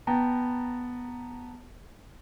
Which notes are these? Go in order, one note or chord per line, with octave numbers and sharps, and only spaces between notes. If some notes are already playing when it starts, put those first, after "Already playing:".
B3 G5 A5 A#5